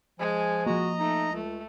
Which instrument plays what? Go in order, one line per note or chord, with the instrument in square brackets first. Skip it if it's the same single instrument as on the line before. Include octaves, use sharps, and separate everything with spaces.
[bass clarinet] F3 [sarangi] G#3 [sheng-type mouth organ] G#5
[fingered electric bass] F3 A#3 [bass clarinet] F#4 [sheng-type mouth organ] D#5 A#5
[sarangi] A3 [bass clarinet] D#4
[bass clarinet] C#2 [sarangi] A3